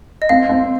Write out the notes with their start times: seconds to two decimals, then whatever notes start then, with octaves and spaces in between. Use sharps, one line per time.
0.22 D#5
0.29 C4 F5
0.49 C4